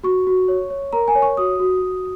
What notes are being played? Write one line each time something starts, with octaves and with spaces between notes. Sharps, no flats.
F#4 C#6
F#4
C#5
C#5
A#4 A#5
G#5
C#5
C#6
F#4 D#6
F#4
F#4